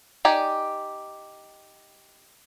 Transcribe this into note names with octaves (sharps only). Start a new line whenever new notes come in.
D#4 G4 D5 G#5